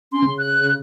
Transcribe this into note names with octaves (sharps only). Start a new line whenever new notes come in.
C#4 C6
C#3
F#6